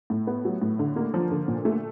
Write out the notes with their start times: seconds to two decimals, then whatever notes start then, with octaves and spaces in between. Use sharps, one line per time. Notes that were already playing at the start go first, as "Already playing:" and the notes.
0.10 A2
0.27 B3
0.45 F#3
0.62 A2
0.79 D3
0.96 A#3
1.14 F3
1.31 D3
1.48 A#2
1.65 A3